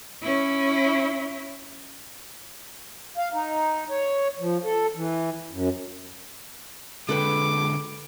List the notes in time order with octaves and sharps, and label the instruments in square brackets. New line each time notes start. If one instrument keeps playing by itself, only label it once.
[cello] C#4 E4
[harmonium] F5
D#4
C#5
F3
A4
E3
F#2
[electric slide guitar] D3 G#3 [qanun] A4 B4 G5 [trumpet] D6